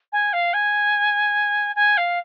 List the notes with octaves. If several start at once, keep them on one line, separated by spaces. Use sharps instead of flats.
G#5
F5
G#5
G#5
F5